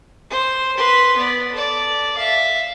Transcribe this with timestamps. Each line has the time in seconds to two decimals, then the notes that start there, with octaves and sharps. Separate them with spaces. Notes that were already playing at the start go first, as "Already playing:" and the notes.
0.30 C5
0.77 B4 C6
1.17 B3 D5
1.52 A4 D5
2.17 E5 F5